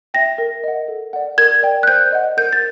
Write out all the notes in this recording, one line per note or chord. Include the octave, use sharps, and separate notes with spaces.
E5 G5 A#6
A#4
D#5 F#5
A4
D5 F#5
A#4 G#6
D5 G5
F#6
C5 G6
D#5 F#5
A#4 G6
A6